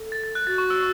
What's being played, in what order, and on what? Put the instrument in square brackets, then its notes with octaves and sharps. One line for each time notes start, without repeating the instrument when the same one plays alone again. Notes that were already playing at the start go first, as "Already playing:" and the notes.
Already playing: [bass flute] A4
[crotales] A6
A6
F#6
[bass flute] F#4 [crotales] A6
[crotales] C#6
E6